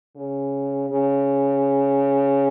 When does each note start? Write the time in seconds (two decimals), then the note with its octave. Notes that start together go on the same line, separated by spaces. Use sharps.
0.16 C#3
0.90 C#3